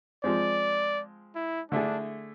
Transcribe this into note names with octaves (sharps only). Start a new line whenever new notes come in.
F3 G#3 C4 D5
E4
D3 A3 D4 E4 G#4